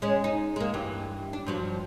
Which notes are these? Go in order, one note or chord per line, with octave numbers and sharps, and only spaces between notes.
G#3 C#4
D#4
G#3 A#3
G2 E3
D4
G2 F3 F#3